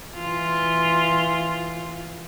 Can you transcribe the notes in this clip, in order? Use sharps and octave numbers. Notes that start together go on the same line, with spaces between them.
E3 F4